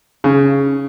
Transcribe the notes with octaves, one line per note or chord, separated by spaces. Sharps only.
C#3